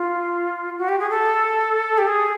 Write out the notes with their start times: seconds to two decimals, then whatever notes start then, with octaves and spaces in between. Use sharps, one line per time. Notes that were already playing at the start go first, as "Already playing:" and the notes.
Already playing: F4
0.78 F#4
0.89 G4
1.00 G#4
1.10 A4
1.98 G4
2.07 G#4